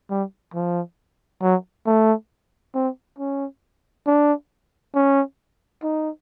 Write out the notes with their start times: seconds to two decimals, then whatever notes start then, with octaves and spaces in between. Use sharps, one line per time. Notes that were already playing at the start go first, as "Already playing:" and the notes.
0.10 G3
0.54 F3
1.42 F#3
1.87 A3
2.75 C4
3.19 C#4
4.06 D4
4.95 C#4
5.83 D#4